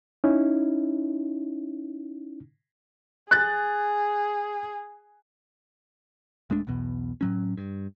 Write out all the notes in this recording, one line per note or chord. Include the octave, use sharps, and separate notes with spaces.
C#4 D#4 E4
G#4 F#6 A6
D#1 G#3 A3 D4
B1 E2 B2
A2 F#3 C#4
G2